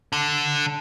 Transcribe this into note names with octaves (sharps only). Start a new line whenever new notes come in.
D3